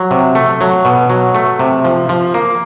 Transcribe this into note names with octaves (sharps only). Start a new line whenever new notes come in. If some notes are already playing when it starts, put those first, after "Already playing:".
Already playing: F#3
C3
A3
F#3
B2
F#3
A3
C3
F3
F3
A#3